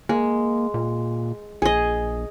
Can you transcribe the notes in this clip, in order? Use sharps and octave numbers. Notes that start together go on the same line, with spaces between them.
G#3 A#3
A#2
A#1 G#4 D#5